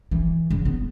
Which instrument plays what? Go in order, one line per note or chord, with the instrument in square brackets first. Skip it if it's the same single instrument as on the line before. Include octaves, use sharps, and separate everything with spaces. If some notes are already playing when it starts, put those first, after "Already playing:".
[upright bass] E3
C#3
B3